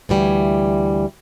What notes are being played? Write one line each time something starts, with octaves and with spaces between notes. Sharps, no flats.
D2 E3 G3